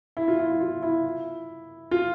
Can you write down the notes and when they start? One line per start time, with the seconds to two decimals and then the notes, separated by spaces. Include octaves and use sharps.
0.17 E4
0.28 F4
0.39 E4
0.61 F4
0.82 E4
1.91 F4